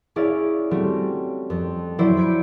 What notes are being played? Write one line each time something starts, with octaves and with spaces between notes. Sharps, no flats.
C#4 E4 G#4 D5 F5
G3 A3 C4 C#4 F#4
F2
F3 F#3 E4 C5 D5
B5 G6 G#6 C#7 D7